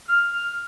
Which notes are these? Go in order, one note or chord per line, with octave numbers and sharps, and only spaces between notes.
F6